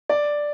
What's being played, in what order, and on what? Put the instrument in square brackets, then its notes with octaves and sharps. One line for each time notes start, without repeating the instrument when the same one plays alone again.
[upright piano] D5